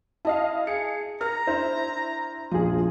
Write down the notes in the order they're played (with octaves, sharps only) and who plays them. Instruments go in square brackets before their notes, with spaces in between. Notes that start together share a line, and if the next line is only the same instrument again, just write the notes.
[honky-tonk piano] E4 D#5 F5 [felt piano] A5
[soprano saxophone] G#4 [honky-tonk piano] C#7
[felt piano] A#4 F6 [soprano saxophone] A#5
[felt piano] D4 [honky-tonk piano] E4 C5
[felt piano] A#1 E2 F3 [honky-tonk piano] F4 G#4